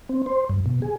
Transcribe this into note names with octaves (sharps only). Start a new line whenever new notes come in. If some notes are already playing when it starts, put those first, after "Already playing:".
C4
C5
G2
B2
G#4